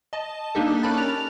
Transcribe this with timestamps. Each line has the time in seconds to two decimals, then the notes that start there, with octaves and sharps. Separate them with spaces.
0.13 D#5 A5
0.55 A#3 D4 D#4 G4 A4
0.83 C#4 A#4 A5 B5 F#6 A6
0.98 F7